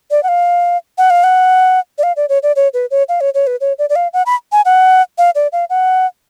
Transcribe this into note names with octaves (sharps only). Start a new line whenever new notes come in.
D5
F#5
F5
F#5
F5
F#5
D5
F5
D5
C#5
D5
C#5
B4
C#5
F5
C#5
C#5
B4
C#5
D5
D5
F5
F#5
B5
G#5
F#5
F5
D5
F5
F#5